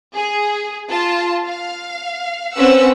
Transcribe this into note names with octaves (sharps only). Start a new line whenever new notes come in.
G#4
F4 A5
F5
C4 C#4 B4 F#5 E6